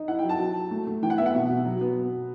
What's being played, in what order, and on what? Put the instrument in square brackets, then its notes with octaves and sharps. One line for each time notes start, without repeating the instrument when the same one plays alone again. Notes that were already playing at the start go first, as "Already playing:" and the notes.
Already playing: [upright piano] D#4
E4 F#5
G5
F#3
A5
F#3
F#3
A3
A3
E3 G5
F#5
B3 E5
F#5
B2
B2
F#3
B3